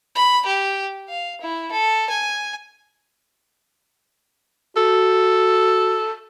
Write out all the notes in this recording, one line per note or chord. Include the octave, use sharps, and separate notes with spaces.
B5
G4
F5
E4
A4
G#5
F#4 A4